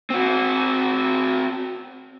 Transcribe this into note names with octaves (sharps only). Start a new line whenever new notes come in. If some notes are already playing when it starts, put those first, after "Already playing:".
C4 F#4